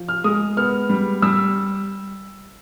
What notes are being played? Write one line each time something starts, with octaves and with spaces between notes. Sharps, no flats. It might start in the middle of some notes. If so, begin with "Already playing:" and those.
Already playing: F3
F6
G#3 D#6
B3 F6
G3
G3 E6